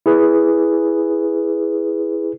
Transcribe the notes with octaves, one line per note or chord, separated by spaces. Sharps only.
E4 G#4 B4